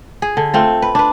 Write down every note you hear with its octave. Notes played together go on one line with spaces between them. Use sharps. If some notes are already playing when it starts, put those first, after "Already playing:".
G#4
D3
A3 C4 F4
B4
D4 B4